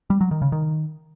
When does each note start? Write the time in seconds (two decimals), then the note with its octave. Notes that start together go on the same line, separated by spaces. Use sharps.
0.10 G3
0.21 F#3
0.31 D#3
0.42 C#3
0.52 D#3